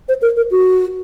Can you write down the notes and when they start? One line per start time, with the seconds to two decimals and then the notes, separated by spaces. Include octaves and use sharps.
0.09 C5
0.22 A#4
0.37 A#4
0.51 F#4